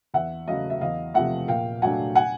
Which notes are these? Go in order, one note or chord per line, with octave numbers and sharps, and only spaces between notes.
E2 E5 F#5
C#3 F#3 A3 D#5 F5
E5
E2 D#5 F5
C3 F3 A3 E5 F#5
A#2 F5 G5
F#3 A3 D4 F#5 G#5
F#5 G#5